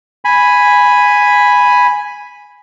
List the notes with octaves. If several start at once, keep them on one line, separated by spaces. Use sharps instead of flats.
G#5 B5